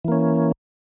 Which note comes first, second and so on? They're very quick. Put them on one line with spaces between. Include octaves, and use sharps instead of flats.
E3 A#3 C#4